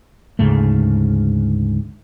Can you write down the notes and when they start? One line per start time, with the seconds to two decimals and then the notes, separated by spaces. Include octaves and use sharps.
0.39 D2 G#2 C#3 A3